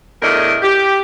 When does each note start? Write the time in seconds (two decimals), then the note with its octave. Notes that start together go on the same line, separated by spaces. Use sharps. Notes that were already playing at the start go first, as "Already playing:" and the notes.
0.22 E2 A2 D4 A#4 D#5
0.62 G4